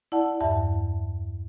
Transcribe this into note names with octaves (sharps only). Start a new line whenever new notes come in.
E4 D5 F#5 A5
E2 G2 E5 A5